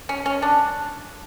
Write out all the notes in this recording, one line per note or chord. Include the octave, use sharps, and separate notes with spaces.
C#4
C#4
D4